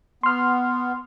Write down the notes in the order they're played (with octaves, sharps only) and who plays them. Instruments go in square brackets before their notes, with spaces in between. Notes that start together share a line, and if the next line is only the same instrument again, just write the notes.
[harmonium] B3 [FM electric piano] C6 F6